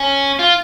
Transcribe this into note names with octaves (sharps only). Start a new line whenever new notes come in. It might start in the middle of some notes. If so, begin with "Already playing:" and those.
Already playing: C#4
F4